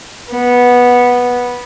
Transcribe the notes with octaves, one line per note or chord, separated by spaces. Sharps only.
B3